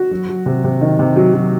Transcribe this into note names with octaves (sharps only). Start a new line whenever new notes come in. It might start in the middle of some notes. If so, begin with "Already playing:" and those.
Already playing: F#4
F#3
F#3
C3
C3
D#3
C3
F#3
F#3